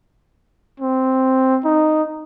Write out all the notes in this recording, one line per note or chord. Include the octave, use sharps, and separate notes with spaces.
C4
D#4